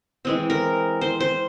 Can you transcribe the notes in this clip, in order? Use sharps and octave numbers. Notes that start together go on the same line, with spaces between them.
E3 G#3 C4
A#4
C5
C5